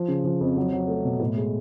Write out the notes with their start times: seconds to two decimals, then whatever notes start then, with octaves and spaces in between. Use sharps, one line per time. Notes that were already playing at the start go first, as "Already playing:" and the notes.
Already playing: F3
0.08 C#3
0.25 F3
0.41 F2
0.57 F#3
0.73 F#3
0.88 A3
1.04 B2
1.20 A2
1.36 G#3